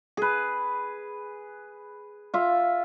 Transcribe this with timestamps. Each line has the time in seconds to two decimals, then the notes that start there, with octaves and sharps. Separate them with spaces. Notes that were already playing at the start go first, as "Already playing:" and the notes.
0.17 G#4 B4
2.34 F4 E5